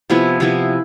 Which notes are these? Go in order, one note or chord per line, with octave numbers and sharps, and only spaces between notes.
C3 F3 B3 E4
C3 F3 B3 E4